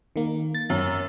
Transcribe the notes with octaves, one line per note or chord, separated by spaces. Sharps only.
D#3 A#3
A6
F#2